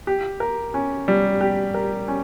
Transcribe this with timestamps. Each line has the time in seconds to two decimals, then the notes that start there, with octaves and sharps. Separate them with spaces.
0.07 G4
0.40 A#4
0.74 C#4
1.08 G3
1.41 G4
1.74 A#4
2.08 C#4